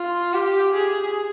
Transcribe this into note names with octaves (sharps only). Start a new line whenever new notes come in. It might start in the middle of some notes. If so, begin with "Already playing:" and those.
Already playing: F4
G4
G#4